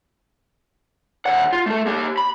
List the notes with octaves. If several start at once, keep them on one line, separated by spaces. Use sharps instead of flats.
D#2 F#5
F4
A3 A4
A#3 G4
B5